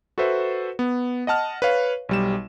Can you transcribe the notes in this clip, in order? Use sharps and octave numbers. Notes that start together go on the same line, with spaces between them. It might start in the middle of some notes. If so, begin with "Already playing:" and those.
F#4 A4 B4 C5 E5
B3
D#5 F#5 A5 F6
B4 C#5 F5
B1 G3 E7